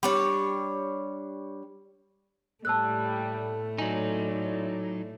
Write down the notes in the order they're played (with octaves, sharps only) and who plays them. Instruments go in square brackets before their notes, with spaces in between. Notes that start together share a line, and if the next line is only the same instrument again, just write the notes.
[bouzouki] G3 D4 C#5
[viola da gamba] A2 A3 [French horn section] G3 [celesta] A5 E6 F#6
[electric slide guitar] F#3 D#4 [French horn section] E4 C#5 D5 [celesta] G#5 F#7